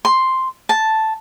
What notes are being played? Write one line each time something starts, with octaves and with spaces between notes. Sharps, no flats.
C6
A5